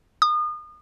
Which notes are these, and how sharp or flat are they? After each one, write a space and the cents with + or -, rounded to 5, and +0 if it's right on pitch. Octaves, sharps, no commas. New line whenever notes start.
D#6 -35